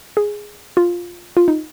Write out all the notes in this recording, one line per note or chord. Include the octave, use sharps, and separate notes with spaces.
G#4
F4
F4
D#4